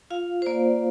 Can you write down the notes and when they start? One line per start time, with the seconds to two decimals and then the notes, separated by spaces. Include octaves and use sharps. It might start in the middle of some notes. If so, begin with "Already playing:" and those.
0.10 F4 F5
0.42 C5
0.46 A#3 D5